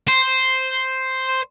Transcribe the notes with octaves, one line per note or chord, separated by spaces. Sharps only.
C5